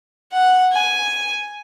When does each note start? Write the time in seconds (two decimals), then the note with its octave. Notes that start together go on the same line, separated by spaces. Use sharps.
0.32 F#5
0.73 G#5